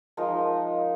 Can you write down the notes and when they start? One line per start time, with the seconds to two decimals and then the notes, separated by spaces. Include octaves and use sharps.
0.17 F3 G#3 D#4 A#4